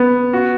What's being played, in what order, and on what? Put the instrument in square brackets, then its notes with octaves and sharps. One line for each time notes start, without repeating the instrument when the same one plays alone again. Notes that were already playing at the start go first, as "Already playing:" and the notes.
Already playing: [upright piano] B3
F#4